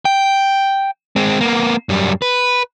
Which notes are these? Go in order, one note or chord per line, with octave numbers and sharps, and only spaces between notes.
G5
G#3 C4
A#3 B3
F#2 G3
B4